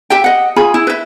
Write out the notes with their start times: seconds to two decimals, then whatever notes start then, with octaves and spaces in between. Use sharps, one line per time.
0.10 G4 E5 G5
0.24 D#5 F#5
0.56 F4 G#4 G#5 B5
0.74 E4
0.87 B4 E5